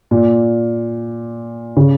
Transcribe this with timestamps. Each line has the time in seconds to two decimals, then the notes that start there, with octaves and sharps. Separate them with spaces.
0.11 A#2
1.77 C#3